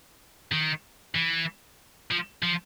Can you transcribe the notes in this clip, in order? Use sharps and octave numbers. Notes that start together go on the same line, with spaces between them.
D#3
E3
F3
F3